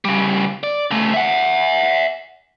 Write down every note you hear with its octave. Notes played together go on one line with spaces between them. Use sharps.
C#3 G3
D5
C#3 A3
E5 F#5